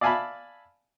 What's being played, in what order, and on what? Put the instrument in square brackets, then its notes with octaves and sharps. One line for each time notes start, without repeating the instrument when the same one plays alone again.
[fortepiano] D5 E5 F5 G#5 A5 B5